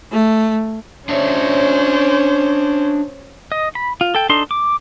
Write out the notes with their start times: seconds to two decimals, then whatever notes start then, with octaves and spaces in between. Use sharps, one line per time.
0.11 A3
1.09 C#4 D4 C5 C#5 E5
3.52 D#5
3.75 B5
4.01 F4
4.15 A4 G5
4.29 D4 D#4 A4 C6
4.51 D6